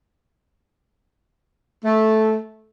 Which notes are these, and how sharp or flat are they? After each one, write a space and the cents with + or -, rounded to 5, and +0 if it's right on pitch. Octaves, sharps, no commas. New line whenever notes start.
A3 -10